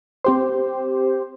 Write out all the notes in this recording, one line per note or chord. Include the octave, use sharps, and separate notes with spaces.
C4 G4 C5